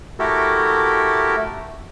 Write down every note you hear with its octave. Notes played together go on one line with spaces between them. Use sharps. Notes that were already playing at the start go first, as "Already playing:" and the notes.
A3 E4 F#4 G4 A4 A#4